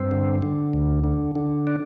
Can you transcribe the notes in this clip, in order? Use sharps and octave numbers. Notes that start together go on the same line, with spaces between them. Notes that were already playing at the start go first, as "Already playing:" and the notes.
Already playing: G2 C4
D3
D3
D2
D3
D3
D4